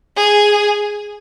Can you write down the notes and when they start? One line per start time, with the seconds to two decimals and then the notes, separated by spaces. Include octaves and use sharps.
0.17 G#4